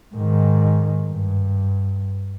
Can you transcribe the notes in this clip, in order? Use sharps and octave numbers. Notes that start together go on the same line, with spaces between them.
G#2 D#3
G2